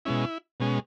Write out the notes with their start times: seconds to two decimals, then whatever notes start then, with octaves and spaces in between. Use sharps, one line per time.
0.05 B2 G#3 C#4 E4
0.60 B2 G#3 C#4